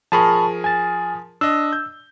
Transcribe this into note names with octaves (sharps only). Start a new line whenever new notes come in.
F3 G#4 A#4 A5 B5 C#6
G#5 A6
D4 D#5 E6
G6